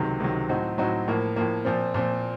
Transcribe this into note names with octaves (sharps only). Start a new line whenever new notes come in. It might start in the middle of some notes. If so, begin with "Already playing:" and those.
Already playing: C#2 C3 D#3 F#3
C#2 C3 D#3 F#3
A2 F#3 C4 D#4 F#4
A2 F#3 C4 D#4 F#4
A2 F3 A#3
A2 F3 A#3
A#2 F3 C4
A#2 F3 C4